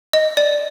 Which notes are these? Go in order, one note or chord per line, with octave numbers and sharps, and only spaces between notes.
D#5
D5